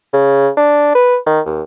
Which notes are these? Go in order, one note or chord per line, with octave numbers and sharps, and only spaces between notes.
C#3
D4
B4
D#3
D#2